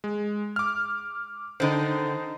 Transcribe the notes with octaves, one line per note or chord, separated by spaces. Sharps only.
G#3
D6 F6
D3 D#3 D#4 C5